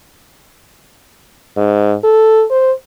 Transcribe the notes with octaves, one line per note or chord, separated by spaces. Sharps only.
G#2
A4
C5